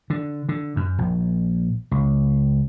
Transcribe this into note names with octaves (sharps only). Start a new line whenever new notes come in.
D3
D3
F#2
A#1
C#2